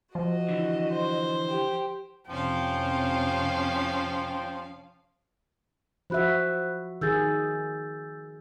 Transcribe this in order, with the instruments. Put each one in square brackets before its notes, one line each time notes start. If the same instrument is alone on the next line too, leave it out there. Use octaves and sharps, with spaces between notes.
[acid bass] F3 [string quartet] F#4 D#5
[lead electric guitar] D3 E3
[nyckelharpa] C5
[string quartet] G4
[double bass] F2 C3 [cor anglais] F3 [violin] C#4 F5 [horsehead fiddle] G5
[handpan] F3 F#4 E5 [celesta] C5 B5 F#6
[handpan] D#3 G#4 [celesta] E6 G6 A6